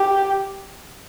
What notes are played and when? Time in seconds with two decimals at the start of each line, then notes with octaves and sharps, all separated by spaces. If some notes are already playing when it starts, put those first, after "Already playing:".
Already playing: G4